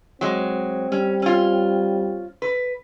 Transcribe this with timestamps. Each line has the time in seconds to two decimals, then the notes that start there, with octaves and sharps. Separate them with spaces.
0.21 F#3 G#3 C4
0.92 G3 C#4
1.22 C#4 F4
2.42 B4